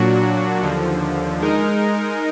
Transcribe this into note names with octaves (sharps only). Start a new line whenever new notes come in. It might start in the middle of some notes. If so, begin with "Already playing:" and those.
Already playing: A#2 F#3 D4 F#4
D#2 D3 F3
G#3 D#4 A#4